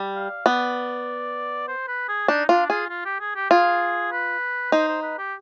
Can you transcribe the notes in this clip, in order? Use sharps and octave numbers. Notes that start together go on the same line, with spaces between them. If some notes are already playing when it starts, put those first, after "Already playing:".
Already playing: G3
F5
B3 D5
C5
B4
G#4
D4 D#4
D4 F4
F4 G#4
F4
G4
G#4
G4
F4 G#4
B4
D#4 C5
C5
B4
G4